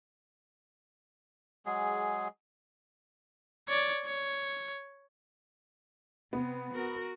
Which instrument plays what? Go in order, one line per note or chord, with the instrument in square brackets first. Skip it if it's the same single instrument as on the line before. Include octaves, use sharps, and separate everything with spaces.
[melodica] F#3 G#3 G#4
[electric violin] C#5 D5
C#5
[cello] C3 [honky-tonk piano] B3
[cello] F#4 A#4